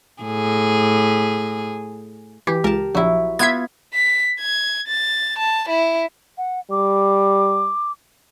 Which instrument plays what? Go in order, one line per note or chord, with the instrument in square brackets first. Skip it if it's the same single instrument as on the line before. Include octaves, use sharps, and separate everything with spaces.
[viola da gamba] A2 G#4
[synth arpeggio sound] E3 [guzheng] G4
[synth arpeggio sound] C#2 [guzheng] A#4 A5
[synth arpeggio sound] A#1 [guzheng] F#3 E4
[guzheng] B3 F4 [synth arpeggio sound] E5 G#6
[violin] B6
G#6
A6
A5
E4
[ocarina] F#5
[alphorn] G3 [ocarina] D6